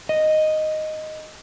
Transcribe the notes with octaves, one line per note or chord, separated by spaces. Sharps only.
D#5